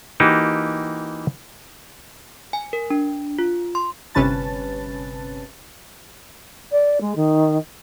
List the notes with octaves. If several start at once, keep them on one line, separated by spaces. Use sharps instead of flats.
E3 A#3 D#4 F#4 G4
G#5
A#4
D4
F4
C6
G1 C3 C#4 B4 A5 A6
D5
G#3
D#3